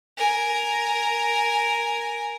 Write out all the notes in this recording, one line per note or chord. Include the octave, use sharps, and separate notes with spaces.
A#4 G#5